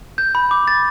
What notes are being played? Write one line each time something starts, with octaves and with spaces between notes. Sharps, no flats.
G6
B5
D6
A6